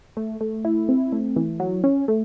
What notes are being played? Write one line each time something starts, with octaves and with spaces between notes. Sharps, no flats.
A3
A3
E4
C4
A3
E3
F#3
C#4
A3